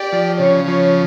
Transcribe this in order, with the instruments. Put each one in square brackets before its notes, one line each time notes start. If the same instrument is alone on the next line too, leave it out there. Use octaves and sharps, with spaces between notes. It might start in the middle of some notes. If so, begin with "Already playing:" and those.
Already playing: [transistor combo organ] G4 [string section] D5
[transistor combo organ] F3
[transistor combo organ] C#3 [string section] C#5
[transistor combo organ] F3